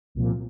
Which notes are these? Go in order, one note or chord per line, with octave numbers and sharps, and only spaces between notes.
C2 A#2 F3